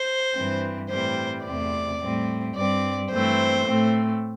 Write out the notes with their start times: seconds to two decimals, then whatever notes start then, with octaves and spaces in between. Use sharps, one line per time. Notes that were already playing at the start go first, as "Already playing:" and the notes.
Already playing: C5
0.34 G2 E3 C4
0.89 A2 E3 G3 C4 C5
1.45 E2 C3 A3 C4 D5
2.01 A2 G3 C4
2.56 G2 G3 C4 D5
3.12 G2 E3 A3 C4 C5
3.67 A2 A3 C4